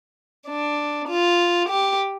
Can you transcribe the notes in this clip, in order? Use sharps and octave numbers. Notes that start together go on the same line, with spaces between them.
D4
F4
G4